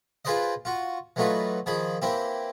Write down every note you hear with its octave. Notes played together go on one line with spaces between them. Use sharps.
F4 G#4 B4 C5 D5 D#5
F4 F#4
E3 F#3 A3 D#4 F4 B4
D#3 F3 G#4 B5
E3 A#3 C4 E4 G4